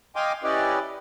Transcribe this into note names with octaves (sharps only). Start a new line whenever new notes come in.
D#5 F5 G5 G#5 C6 D6
C#4 E4 G4 B4 D5 D#5